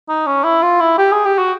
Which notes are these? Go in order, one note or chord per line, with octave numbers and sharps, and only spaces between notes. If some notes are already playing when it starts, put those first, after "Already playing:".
D#4
C#4
E4
F4
E4
G4
G#4
G4
F#4